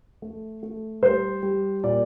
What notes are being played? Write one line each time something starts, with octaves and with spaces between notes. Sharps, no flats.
A3
A3
G3 C5
G3
A#2 D5